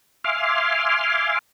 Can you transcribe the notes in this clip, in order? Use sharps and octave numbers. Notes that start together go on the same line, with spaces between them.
E5 F5 G#5 C6 D6 F6